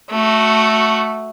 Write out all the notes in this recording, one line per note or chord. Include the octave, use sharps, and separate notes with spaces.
A3 F#4